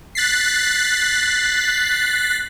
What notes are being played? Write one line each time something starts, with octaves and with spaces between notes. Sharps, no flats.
F#6 A6 B6 C7